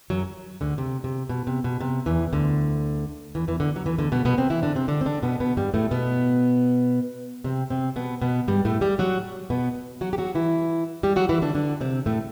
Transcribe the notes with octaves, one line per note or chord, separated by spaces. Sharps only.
F#2 F#3
D2 D3
C3
C3
B2
C3
B2
C3
E2 E3
D2 D3
E2 E3
E2 E3
D2 D3
F#3
E2 E3
D2 D3
B2 B3
B2 B3
C3 C4
E3 E4
D3 D4
C3 C4
D3 D4
C4
D3 D4
B2 B3
B2 B3
G2 G3
A2 A3
B2 B3
C3 C4
C3 C4
B2 B3
B2 B3
G2 G3
A2 A3
G3 G4
F#3 F#4
B2 B3
F#3 F#4
G4
F#3 F#4
E3 E4
G3 G4
F#3 F#4
E3 E4
D3 D4
D3 D4
C3 C4
A2 A3